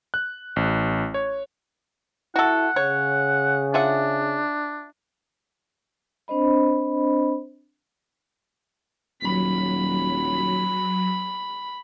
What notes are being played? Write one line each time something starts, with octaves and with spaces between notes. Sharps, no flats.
F#6
A1
C#5
E4 F#4 A4 F#5
C#3 C#5
D4 F4 E5 F#5
C4 D4 C5 D#5 B5
D#1 F#3 B5